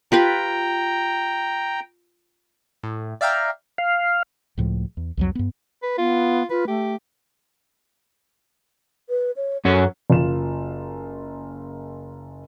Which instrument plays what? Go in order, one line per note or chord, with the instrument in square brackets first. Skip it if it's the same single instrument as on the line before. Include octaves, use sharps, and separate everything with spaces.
[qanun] F4 G4 B4 [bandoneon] G5 A#5
[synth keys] A2
D5 E5 F5 G5 A#5
[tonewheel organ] F5
[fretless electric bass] C#2 A2 F3
E2
C2 F2 F#3
G2 B3
[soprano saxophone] B4
[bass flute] B3 [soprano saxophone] F4
[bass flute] F4 [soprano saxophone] B4
[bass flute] A3 [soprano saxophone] G4
[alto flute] B4
C#5
[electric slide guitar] F#2 C#4 [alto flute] A4
[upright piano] F#1 F4 E7